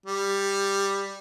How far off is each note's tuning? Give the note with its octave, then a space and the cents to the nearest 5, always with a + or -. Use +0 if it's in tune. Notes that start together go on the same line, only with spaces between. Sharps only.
G3 +10